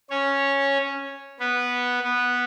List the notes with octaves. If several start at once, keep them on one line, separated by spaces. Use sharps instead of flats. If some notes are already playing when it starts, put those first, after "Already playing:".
C#4 C#5
B3 B4
B3 B4